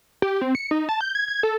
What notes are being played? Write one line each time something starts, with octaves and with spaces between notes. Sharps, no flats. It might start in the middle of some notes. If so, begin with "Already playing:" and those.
G4
C4
C#7
D#4
A5
G6
G#6
G#6
A4